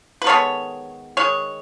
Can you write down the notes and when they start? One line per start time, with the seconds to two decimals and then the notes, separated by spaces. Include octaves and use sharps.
0.22 B4
0.26 D#3 G#3 B3 A4 C#5
1.17 D#3 G#3 C#5